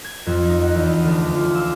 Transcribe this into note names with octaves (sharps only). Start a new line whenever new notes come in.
G#6
F2
D#4
F#5
E2
D2
F4
E6